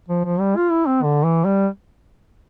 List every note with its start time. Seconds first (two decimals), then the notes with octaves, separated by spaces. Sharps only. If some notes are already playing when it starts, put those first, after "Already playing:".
0.09 F3
0.25 F3
0.40 G3
0.56 F4
0.71 E4
0.87 C4
1.03 D3
1.24 E3
1.45 G3